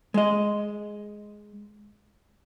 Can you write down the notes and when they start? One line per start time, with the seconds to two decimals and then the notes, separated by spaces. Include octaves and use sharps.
0.14 G#3 D#5